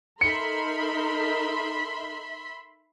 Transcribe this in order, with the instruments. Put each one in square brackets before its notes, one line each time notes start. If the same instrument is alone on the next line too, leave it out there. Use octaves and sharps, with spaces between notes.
[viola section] D#4 A4 A#4 [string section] E5 B5 C6 [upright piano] C#7